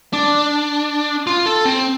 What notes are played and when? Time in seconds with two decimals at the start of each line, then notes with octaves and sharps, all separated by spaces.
0.13 D4
1.27 F4
1.46 A4
1.65 C4